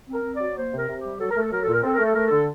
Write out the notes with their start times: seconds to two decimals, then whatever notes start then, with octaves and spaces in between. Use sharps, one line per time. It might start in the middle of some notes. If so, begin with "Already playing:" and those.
0.08 C4
0.14 A#4
0.24 C4
0.35 D5
0.41 F#3
0.56 A#3 C5
0.72 C3
0.78 A#4
0.88 C3
0.98 G4
1.04 G3
1.19 F#3 A4
1.30 A#4
1.36 A3
1.42 A4
1.51 F#3 A#4
1.63 A#2 A4
1.73 A#4
1.83 C4 A4
1.93 A#4
1.98 A3
2.05 A4
2.14 A3 A#4
2.26 D3 A4